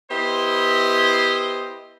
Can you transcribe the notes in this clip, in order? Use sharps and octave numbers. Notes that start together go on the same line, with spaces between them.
B3 E4 G4 C5 D#5